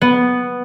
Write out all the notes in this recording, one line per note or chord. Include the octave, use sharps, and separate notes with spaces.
B3